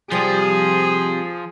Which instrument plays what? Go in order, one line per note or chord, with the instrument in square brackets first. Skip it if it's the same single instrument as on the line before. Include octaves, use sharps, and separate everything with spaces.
[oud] C3 G3 [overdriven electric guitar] F3 [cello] G#4